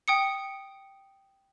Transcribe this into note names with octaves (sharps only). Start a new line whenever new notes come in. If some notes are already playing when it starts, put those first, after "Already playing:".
G5 D#6 C#7